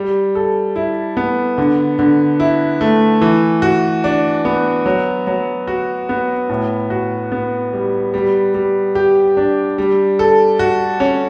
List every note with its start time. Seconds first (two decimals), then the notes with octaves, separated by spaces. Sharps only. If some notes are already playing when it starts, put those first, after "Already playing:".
Already playing: G3
0.35 A4
0.76 E4
1.17 B3
1.58 D3
1.99 D3
2.40 E4
2.81 A3
3.21 E3
3.62 F#4
4.04 D4
4.45 B3
4.86 F#3
5.27 F#3
5.68 F#4
6.09 B3
6.49 A2
6.90 F#4
7.32 B3
7.73 G3
8.14 G3
8.54 G3
8.95 G4
9.37 D4
9.78 G3
10.19 A4
10.59 F#4
11.00 C#4